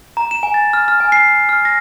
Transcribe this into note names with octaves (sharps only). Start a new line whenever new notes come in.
A#5
E7
G#5
A6
F6
F6
G#5
C7
C7
F6
A#6